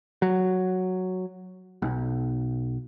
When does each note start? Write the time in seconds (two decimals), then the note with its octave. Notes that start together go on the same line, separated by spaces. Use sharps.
0.22 F#3
1.82 B1